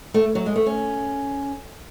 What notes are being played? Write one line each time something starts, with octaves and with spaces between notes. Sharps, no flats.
A3
F#3
G#3
A3
C#4